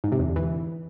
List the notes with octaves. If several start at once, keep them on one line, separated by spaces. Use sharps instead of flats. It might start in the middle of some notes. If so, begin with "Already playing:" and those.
G#2
C3
E2
D3
E3